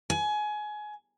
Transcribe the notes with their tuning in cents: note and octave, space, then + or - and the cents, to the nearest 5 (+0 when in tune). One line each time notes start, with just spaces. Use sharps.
G#5 +25